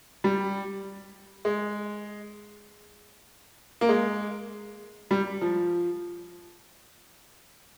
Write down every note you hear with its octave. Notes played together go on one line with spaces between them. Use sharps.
G3
G#3
A#3
G#3
G3
F3